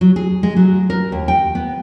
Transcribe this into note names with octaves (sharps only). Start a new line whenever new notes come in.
F#3
G#4
G#3
F#3
A#4
D#2
G5
B3